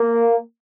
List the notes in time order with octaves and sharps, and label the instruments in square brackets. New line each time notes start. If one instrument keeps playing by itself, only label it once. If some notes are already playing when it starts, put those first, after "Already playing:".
Already playing: [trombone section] A#3